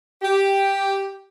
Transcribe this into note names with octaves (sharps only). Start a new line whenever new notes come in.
G4